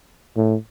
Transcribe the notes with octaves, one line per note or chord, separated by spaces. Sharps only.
A2